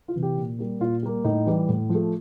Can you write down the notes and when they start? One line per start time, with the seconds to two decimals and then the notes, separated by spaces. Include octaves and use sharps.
0.08 F4
0.16 C3 E3
0.23 G4
0.37 A#2
0.59 G3 A#3
0.80 A#2 F4
1.03 G3 A#3
1.24 A2 D#4
1.46 E3 G3
1.69 A2
1.89 F3
1.95 A3